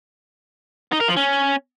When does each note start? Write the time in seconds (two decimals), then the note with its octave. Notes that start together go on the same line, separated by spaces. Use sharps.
0.92 D#4
1.00 A#4
1.08 F3
1.16 C#4